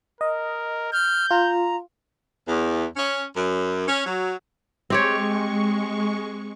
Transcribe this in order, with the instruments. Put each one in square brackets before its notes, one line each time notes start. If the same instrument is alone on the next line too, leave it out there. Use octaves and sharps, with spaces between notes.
[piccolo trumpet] A#4 [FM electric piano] D#5
[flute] F6 [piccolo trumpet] G6
[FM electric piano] F4 [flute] A#5
[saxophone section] E2
C#4
F#2
C#4
F#3
[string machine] G#3 C#6 [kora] C4 G4 C#5